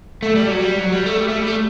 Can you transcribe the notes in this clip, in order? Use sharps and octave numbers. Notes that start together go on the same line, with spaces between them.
A3
G3
F#3
G3
F#3
G3
A3
G3
A3
G3
A3